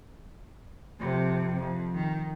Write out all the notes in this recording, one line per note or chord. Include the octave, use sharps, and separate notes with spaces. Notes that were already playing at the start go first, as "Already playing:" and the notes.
F2 C3
F2
D#3